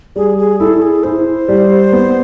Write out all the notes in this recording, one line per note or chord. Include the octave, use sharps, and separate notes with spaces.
G3 G#4
G#4
E4 A4
G#4
E4 C5
G3
B3